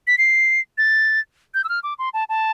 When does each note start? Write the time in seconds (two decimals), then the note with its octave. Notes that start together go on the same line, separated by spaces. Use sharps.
0.07 B6
0.18 C7
0.78 A6
1.54 G6
1.64 E6
1.69 F6
1.83 D6
1.99 C6
2.13 A5
2.29 A5